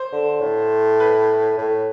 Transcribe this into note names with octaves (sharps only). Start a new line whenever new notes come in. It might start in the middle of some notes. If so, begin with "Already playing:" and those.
Already playing: C5
D3
A2
B4
A2